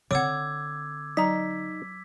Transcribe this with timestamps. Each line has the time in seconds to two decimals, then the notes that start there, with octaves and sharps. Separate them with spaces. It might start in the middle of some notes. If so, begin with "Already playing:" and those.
0.11 D3 C4 C#5 F#5 D6 E6 G#6
1.17 F#3 D#4 A#5 B6